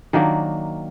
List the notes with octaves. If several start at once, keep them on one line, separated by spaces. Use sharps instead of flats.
D#3 F#3 A#3 D4